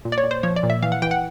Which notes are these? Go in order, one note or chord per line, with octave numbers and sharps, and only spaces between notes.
A#2
D5
C#5
A#2
C5
F3 C#5
D5
A#2
E5
E3 F5
F#5
E3 G5
F#5